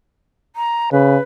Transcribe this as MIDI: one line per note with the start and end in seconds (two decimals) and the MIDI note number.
0.56 0.90 82
0.92 1.17 49
0.92 1.21 71